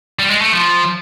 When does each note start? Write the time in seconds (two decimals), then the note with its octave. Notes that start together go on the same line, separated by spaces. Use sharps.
0.19 G3
0.30 G#3
0.41 A3
0.53 F3